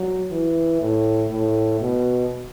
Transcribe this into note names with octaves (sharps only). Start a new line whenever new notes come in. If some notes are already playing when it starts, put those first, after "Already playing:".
Already playing: F#3
E3
A2
A2
B2